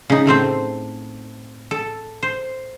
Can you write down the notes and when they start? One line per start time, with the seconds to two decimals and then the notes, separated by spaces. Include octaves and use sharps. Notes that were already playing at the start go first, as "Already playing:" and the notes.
0.10 C#3 D#4
0.26 A2 A3 C4 C5
1.71 A4
2.23 C5